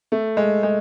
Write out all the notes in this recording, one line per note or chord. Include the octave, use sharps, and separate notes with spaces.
A3
G#3
G#3